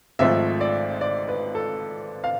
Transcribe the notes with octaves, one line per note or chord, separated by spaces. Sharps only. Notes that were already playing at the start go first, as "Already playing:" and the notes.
G#1 G#2 F3 A3 C4 E5
D5
D5
B4
A4
F5